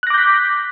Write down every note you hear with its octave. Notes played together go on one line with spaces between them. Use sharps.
D6 F#6 G6 A#6 B6